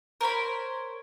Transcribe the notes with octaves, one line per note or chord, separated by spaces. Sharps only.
A#4 C5 C#5 B5